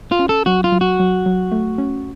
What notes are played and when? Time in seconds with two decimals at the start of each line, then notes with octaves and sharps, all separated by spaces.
0.12 F4
0.19 C#4
0.29 A4
0.46 F#3 F#4
0.64 F4
0.72 F#3
0.81 F#4
1.00 F#3
1.26 F#3
1.52 A3
1.78 C#4